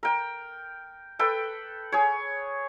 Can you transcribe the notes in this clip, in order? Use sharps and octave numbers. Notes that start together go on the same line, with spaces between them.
A#4 G5
A4 B4 G5
G#4 C#5